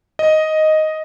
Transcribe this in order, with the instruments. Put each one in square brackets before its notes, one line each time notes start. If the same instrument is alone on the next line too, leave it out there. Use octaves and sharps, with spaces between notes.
[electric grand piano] D#5